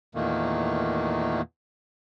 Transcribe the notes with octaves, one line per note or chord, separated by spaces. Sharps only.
E2 A#2 D#3 A3 A#3